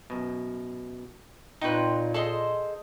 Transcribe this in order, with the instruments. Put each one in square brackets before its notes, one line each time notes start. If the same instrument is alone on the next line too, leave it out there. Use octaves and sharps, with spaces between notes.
[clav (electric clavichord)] F#2 B2
[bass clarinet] A#2 [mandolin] C4 C#5 F#6 [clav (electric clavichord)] D#4 B4
[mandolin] G#4 C5 D#5 [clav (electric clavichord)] A4